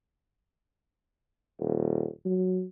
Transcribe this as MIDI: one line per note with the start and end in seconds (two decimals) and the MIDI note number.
1.60 2.06 27
2.26 2.64 54